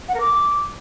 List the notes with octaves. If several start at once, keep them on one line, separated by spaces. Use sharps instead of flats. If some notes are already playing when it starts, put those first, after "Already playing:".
F#5
A#4
D6